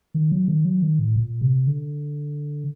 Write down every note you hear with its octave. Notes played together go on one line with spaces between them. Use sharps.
D#3
F#3
D#3
F#3
D#3
A2
A#2
C3
D3